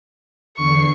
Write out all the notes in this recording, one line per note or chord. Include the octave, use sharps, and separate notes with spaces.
E2 D3 C#6 C7